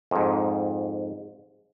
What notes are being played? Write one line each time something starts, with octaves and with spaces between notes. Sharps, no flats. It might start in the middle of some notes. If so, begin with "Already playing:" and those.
F2 G#2